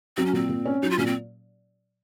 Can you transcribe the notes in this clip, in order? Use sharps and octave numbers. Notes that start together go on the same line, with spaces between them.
F#3 C4
C#4
A#2 C4
A#2
C#4
F#3 D#4
F4
A#2 C#4
C4